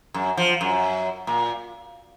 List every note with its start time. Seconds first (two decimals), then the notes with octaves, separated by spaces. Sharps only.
0.14 F#2
0.37 F3
0.61 F#2
1.27 A#2